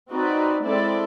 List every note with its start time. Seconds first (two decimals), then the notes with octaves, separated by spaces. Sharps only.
0.11 C4 D#4 F#4 B4 D5
0.65 G#3 C4 E4 A4 D5